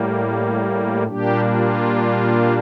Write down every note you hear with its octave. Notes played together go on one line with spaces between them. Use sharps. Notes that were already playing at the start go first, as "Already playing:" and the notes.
Already playing: A2 G3 A#3
A#2 G3 A#3 D4 G4
F4